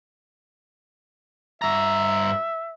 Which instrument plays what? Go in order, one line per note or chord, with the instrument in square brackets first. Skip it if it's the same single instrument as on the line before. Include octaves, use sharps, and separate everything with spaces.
[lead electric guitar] G2 A#5 [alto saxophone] E5